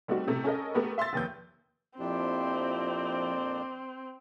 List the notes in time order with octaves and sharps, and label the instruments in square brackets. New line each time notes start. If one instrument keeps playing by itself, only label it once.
[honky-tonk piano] G3 A3 C4 D#4 F#4
A2 C3 A3
C#4 A4 A#4 D#5
A3 B3 G4 A#4 B4
E5 C6 E6 A6
F1 D#2 G6
[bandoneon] F2 A#2 D4 [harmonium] F3 E4 G4 [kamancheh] C4